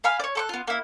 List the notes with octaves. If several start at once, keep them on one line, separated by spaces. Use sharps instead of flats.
F5 G#5 B5 F6
C#5 D5
A4 C#6 F#6
B3 F4
A#3 E4